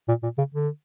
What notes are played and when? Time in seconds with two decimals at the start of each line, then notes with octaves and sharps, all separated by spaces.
0.08 A#2
0.23 A#2
0.38 C#3
0.54 D3